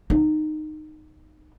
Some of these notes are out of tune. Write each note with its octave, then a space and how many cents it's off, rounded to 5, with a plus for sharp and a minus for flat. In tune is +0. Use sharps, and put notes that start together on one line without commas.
B3 +0 D#4 -15